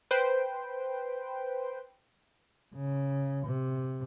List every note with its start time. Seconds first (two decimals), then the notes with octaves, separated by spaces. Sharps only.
0.11 B4 C5 G5
2.74 C#3
3.46 C3